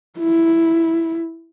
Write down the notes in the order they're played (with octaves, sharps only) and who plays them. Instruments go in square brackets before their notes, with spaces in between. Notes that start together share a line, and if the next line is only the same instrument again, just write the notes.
[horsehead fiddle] E4